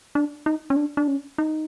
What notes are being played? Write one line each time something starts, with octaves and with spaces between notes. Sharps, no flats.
D4
D#4
C#4
D4
D4
C#4
D#4